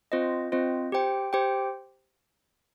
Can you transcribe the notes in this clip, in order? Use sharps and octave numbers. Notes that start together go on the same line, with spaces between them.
C4 F4 C5 D#5
C4 F4 C5 D#5
G4 C5 G5
G4 C5 G5